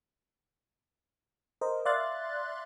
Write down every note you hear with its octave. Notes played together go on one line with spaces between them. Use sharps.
A#4 C5 D#5
D5 E5 F5 C6 F#6 A6